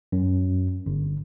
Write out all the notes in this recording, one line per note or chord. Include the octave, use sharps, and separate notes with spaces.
F#2
G1